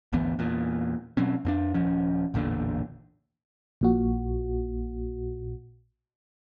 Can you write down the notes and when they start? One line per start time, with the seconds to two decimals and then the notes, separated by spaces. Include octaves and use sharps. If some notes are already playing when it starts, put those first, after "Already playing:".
0.13 G#1 D2 E3 B3
0.39 E2 A#2
1.17 B2 F#3 C4 C#4
1.45 F2 C4 D4
1.74 D#1 F3 C#4
2.34 A1 E2 A#2 D3
3.81 A#1 A#2 F#4